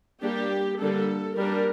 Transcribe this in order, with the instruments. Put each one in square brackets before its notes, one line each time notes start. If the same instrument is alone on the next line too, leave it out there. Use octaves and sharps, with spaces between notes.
[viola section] G3 A#3 D4 G4
D3 G3 A#3 D4 A4
G3 A#3 D4 A#4